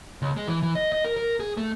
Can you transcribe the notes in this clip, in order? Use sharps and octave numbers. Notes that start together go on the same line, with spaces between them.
C#2
G#3
E3
E3
D#5
D#5
A#4
A#4
G#4
A3